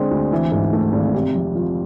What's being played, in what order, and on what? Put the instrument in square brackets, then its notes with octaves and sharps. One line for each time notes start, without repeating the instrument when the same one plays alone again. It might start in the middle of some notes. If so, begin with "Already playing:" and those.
Already playing: [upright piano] D3 G#3 C4
D2
E3
G#2
A3
G#1
C3
F2
F3